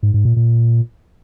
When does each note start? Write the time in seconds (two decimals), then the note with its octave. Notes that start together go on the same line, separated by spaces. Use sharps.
0.03 G#2
0.14 G#2
0.25 A#2
0.36 A#2